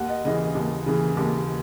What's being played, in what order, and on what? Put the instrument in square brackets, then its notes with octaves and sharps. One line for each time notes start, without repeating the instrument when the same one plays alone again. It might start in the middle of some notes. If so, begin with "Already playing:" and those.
Already playing: [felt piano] D#2 F#5
D#5
C#3 E3 D#5
D#2
C#3 E3
D#2